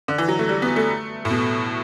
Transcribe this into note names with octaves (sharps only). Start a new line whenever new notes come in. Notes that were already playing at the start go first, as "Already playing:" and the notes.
D3
E3
F#3
A3
G3
B3
A3
A2
B2